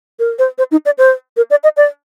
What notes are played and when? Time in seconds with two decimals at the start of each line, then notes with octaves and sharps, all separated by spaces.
0.19 A#4
0.39 C5
0.58 C5
0.71 D#4
0.86 D5
0.98 C5
1.37 A#4
1.50 D5
1.64 D#5
1.77 D5